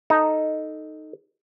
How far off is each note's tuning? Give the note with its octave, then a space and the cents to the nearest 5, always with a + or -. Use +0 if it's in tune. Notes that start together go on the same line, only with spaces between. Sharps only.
D#4 +0 A4 +0